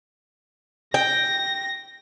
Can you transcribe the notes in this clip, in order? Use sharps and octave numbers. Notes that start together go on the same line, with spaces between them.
G5 A#6